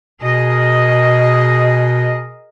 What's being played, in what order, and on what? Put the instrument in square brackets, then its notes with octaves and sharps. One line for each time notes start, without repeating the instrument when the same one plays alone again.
[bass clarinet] B2 [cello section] G#4 A#4 D#5